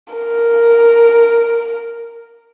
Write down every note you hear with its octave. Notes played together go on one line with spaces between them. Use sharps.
A#4